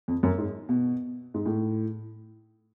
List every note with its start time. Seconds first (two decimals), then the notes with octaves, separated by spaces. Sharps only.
0.08 F2
0.23 F#2
0.38 G#2
0.69 B2
1.34 G#2
1.46 A2